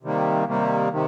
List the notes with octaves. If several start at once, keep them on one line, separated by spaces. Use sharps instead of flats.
C3 D#3 G3 A#3
C3 D#3 G3 A#3
C3 D#3